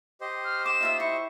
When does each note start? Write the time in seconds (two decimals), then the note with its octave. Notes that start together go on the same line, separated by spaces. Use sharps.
0.21 G4 C5 D#5
0.44 F6
0.66 D6 E7
0.80 D#4 F4 E5
1.00 E4 C#6